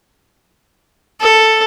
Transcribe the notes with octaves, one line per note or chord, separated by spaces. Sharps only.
A4